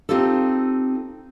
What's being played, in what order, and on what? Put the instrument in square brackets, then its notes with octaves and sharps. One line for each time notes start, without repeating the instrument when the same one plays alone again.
[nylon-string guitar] C4 D#4 F4 G4 A4